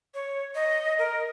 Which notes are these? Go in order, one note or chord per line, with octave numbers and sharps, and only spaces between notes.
C#5
D#5
A#4